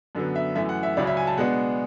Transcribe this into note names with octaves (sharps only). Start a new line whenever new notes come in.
F#2 D3 F#3 B3
E5
F#2 E3 A3 E5
F#5
E5
C#2 C#3 F#3 C#4 D5
E5
G#5
A5
B2 G#3 B3 D4 F#5